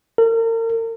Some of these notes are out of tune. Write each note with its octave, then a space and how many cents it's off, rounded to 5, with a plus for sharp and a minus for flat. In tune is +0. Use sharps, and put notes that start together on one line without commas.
A#4 -40